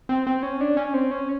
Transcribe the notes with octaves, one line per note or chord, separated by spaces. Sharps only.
C4
C4
C#4
D4
C#4
C4
C#4